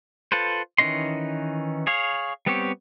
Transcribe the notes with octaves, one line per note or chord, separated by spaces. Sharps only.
F4 A4 B4 C5
D#3 E3 C#4 D#5 C6
G#4 C#5 F5
G3 B3 C4 G4 C#5